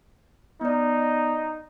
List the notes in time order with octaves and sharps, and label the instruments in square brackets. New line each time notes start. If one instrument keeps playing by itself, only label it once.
[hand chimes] B3 D5 [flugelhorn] D#4